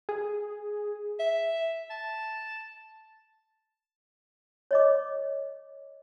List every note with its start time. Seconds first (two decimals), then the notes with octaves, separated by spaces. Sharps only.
0.09 G#4
1.20 E5
1.90 A5
4.71 C#5 D#5 D6